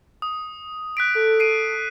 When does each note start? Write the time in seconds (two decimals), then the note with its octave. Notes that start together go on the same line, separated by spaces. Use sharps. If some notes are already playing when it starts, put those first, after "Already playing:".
0.22 D#6
0.97 F#6 B6 D7
1.15 A4
1.40 C7 D7 D#7